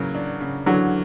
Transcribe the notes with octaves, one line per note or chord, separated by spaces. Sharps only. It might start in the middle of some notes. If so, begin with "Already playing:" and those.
Already playing: C#3 E3 F#3 A#3
D4
C#3
D3 E3 F#3